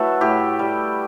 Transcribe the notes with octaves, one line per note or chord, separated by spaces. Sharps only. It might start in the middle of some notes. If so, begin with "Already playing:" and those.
Already playing: F#3 A3 E4 A4 B4
A2 G4
G3